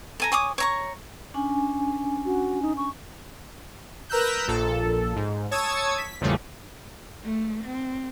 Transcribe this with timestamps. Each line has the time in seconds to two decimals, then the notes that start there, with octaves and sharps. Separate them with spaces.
0.20 A4 G#5 A#5
0.32 C#5 G#5 D6 D#6
0.58 C#5 A#5 C#6
1.34 C#4 D4 G#5
2.26 F#4
2.62 D#4
2.77 C#6
4.09 A#4 B4 A#5 E6 F#6 G6
4.48 A#1 A#2 A4
5.16 G#2
5.51 C#5 A5 C#6 D#6 E6 G#6
5.98 B6
6.21 A#1 E2 A#2 C#3 G3 A3
7.24 A3
7.64 C4